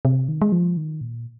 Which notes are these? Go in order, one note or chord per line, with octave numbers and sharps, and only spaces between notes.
C3
D#3
G#3
F3
D#3
A#2